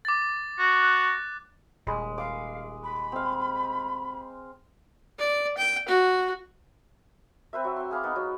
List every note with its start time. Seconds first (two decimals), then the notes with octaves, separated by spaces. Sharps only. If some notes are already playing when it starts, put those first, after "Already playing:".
0.05 D6 A6
0.59 F#4
0.83 F#6
1.87 D#1 G#3 B5
2.18 F5 D6
2.83 B5
3.12 C4 F5
5.19 D5
5.58 G5
5.88 F#4
7.53 C4 B4 C5 E5
7.64 F#3 E5
7.76 G5 C6
7.91 G#4 F5 B5 D6
8.04 B3 D#4
8.16 F#3